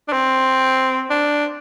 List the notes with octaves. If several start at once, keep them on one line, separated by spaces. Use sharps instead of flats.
D4
C4
D4